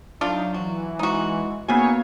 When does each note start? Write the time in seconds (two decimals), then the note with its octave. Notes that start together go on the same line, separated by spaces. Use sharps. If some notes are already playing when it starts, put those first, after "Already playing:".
0.21 F#3 A3 D4 D#4 F4
0.54 E3 F#4
0.99 G#3 D#4 F#4
1.68 C#3 A#3 B3 D#4 F#4 C#5 G#5